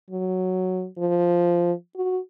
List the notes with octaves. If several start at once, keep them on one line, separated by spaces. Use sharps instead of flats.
F#3
F3
F#4